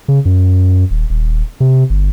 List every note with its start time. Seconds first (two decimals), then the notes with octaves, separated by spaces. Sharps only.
0.08 C#3
0.25 F#2
0.91 D#1
1.10 D#1
1.60 C3
1.90 G1